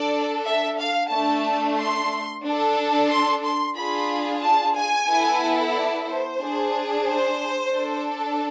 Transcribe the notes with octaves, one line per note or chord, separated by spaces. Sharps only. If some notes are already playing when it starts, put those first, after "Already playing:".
Already playing: D4 A4 D5
E5
F5
A3 D4 A4 A5
C6
D4 A4
C6
C6
D4 F4 G#4 B5
A5
G#5
B3 E4 A4
D5
C5
D4 G#4
C5
D4 A4